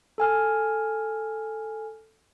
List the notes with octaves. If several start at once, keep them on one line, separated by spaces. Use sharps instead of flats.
A4 G#5 F6